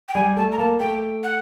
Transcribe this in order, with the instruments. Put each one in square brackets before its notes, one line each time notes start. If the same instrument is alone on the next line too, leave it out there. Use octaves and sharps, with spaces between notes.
[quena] G5
[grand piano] G3 [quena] G#5
[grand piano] A3 [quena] A5
[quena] A#5
[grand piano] A#3 [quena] A5
[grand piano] A3 [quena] G5
[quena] F#5